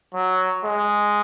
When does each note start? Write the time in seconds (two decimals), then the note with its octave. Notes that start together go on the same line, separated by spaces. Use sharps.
0.14 F#3
0.65 G#3